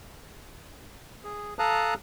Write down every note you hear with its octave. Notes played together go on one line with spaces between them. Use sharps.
G#4
A4 F5 A5 A#5 D#6 F#6